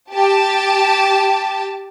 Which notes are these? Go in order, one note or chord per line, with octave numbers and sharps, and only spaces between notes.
G4 A5